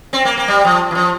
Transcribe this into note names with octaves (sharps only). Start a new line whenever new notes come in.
C4
A#3
A#3
G3
F3
E3
F3